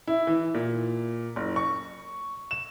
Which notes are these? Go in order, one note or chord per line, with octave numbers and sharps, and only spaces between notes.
E4
E3
A#2
F#1
C#6
E7